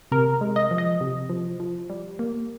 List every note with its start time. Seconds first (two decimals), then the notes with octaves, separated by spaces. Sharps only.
0.11 C3 A#4
0.41 G#3
0.56 D#5
0.71 F3
0.78 D#5
1.01 C3
1.30 F3
1.60 F3
1.90 G3
2.19 A#3